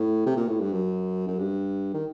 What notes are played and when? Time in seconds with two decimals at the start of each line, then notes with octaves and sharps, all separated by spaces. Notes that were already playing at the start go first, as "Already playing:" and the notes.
Already playing: A2
0.26 C3
0.36 A#2
0.48 A2
0.61 G2
0.72 F#2
1.28 F#2
1.39 G2
1.94 D#3